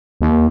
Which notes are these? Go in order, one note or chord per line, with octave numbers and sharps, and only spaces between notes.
D#2